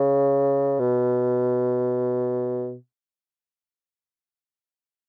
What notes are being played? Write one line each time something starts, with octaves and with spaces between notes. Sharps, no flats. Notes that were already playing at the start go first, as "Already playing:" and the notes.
Already playing: C#3
B2